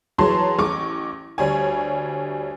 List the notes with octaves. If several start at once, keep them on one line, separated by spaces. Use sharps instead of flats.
E3 F#3 G#4 C#5 A5 C6
A1 C#6 D6
D2 G3 C#5 G#5